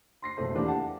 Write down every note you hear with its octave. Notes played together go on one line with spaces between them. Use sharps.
C6 A#6 C7
E1 F2 A3 C5
E3 A#3 D4 G4 A#4
F#5 A5